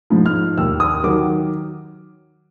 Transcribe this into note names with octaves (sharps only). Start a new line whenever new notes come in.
G#2 F3
F6
D#2 E6
D#6
D#3 F#3 D6